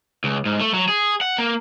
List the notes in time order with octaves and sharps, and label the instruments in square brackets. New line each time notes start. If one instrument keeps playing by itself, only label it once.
[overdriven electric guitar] C#2
G#2
A3
F#3
G#4
F#5
A#3